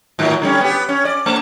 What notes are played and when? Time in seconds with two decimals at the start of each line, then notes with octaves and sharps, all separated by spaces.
0.19 G#2 D#3 F#3
0.42 D3 G3 C#4
0.61 B3 G4
0.89 C#4
1.05 D5
1.26 A3